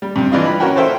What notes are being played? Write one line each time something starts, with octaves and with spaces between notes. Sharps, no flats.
G3
G2 C3
E3 D4 F4 D#5
B5
C#4 F#4 A#4 G5
A4 C5 E5 G5